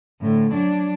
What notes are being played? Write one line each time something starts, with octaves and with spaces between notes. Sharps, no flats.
A2 D3
F#3 D4